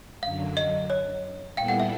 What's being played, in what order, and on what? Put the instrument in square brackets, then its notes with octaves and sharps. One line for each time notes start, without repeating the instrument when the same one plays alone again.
[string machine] F#2 D3 F#3 [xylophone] F5
[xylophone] D#5
C#5
[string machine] A#2 G3 B3 E4 A4 [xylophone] F5 G5
[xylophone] F#5
E5